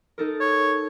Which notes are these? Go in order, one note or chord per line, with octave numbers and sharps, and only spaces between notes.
D#4 A4 A#4
C#5